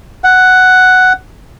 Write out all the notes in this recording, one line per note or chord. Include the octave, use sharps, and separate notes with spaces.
F#5